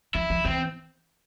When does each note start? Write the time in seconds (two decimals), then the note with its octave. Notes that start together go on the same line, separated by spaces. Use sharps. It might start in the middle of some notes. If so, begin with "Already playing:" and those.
0.14 F3 E4
0.30 F3
0.44 E3 C4